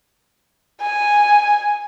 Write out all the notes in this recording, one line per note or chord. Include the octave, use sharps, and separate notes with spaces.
G#5